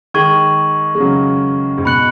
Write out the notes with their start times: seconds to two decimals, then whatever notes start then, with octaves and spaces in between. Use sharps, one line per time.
0.14 D#3 G#3 C#6 G#6 D#7 F#7
0.95 G#3
1.00 C#3 F#3
1.78 G#2
1.85 B2 B5 F#6 C#7 F#7